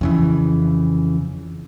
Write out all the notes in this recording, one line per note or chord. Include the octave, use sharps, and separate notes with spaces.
F2 C#3 E3